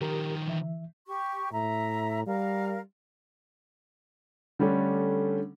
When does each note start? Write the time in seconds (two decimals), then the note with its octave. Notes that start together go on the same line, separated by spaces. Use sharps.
0.01 D#3 F3 G4 A#4 A#5
0.47 E3 E5
1.07 G4 C#6
1.52 A2 E5 A#5
2.27 G3 A#4 F5
4.59 D3 G3 A3 C#4 D4